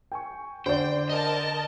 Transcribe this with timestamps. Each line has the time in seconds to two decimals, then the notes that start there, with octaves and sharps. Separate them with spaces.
0.12 G5 G#5 C#6
0.66 D3 C5 D5 G5
1.10 A#4 D#5 A5